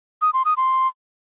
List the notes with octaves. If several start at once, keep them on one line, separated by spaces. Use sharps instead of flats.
D#6
C6
D#6
C6